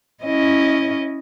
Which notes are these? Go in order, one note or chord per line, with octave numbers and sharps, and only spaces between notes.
C#4 E4 D#5